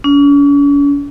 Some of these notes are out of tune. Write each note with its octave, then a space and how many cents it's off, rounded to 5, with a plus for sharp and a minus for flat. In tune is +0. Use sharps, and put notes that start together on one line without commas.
C#4 +45